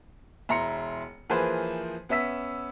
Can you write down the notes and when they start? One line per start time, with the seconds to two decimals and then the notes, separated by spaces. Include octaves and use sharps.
0.49 E1 E4 A#5 C6 C#7
1.30 E3 F3 A#3 G#4 B4 C5
2.09 B3 C#4 E5 E6 B6